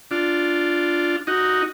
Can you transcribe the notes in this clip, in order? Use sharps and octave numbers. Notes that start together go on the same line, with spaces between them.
D4 F4
D#4 F#4